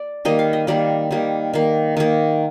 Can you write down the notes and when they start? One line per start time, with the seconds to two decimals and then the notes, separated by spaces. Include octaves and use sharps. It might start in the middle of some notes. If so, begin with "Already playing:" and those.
Already playing: D5
0.25 D#3 G3 A#3 D#5
0.39 F5
0.53 D#5
0.67 D#3 G3 A#3 D5
1.11 D#3 G3 A#3
1.53 D#3 A#3
1.97 D#3 A#3